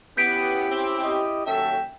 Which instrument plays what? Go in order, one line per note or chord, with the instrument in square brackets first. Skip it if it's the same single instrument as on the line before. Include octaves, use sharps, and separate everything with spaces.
[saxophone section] B3 [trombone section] C#4 E4 G4 [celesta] G6 B6 D7
[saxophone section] C4
[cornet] D#5
[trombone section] D#2 C#4 A4 [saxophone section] F#3 E5 [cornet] G5